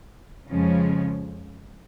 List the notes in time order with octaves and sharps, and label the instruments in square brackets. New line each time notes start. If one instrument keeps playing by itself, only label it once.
[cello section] F2 C#3 F3 G#3 C#4